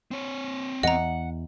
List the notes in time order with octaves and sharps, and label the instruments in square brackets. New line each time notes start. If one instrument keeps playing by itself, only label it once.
[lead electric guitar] C4 C#5
[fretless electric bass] E2 [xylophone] D#5 A#5 [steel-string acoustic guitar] F#5